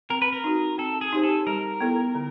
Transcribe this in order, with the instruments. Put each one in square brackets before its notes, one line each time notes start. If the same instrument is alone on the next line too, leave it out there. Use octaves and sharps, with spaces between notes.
[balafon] C4 [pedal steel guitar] A#4
[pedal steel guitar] B4
A#4
[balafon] D#4 F#4
[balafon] C4 [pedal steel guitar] A4
[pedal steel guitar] G#4
[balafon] D#4 G4 C5
[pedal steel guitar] A4
[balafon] G3 [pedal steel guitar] A#4
[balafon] B3 E4 A4
D3